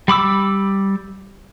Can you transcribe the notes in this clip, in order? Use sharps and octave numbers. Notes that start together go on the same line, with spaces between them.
G3 B5 D6 E6